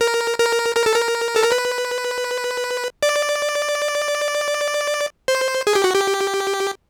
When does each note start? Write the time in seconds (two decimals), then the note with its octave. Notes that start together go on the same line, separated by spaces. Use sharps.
0.01 A#4
0.39 A#4
0.76 A#4
0.86 A4
0.95 A#4
1.36 A4
1.44 A#4
1.52 B4
3.03 D5
5.28 C5
5.67 G#4
5.75 G4
5.84 F#4
5.94 G4